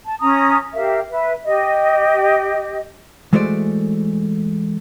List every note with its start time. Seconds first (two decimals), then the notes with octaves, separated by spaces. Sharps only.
0.05 A5
0.20 C#4 A#5 D#6
0.74 G4 A#4 E5 F5
1.10 B4 E5
1.46 G4 D#5
3.33 E3 G#3 A3 F#4 C5 D5